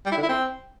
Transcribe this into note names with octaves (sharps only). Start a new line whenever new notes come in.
G3
E4
D3
E4
C4